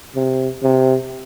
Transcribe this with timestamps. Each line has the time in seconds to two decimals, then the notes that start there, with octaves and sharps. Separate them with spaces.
0.16 C3
0.63 C3